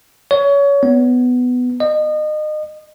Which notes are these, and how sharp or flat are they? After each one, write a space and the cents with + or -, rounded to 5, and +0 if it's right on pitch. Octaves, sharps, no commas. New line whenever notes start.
C#5 +25
B3 +10
D#5 -30